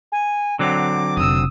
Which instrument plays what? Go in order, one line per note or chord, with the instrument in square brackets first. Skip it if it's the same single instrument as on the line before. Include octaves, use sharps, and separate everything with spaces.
[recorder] G#5
[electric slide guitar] D3 F#3 C4 [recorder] D6
[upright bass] F1 [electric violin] D#6 E6